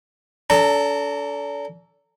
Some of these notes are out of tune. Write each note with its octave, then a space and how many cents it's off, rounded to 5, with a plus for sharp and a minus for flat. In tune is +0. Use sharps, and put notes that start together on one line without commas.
D4 -40 A4 +0 A#5 -20